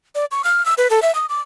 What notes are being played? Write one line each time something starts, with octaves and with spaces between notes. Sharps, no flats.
D5
C#6
F6
E6
B4
A4
E5
D#6
D6